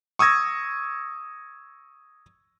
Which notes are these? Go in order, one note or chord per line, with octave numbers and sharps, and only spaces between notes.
C#6 D#6 E6 G#6 A#6